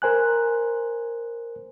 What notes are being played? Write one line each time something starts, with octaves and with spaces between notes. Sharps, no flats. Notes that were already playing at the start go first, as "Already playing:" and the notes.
A#4 C5 G#5 F#6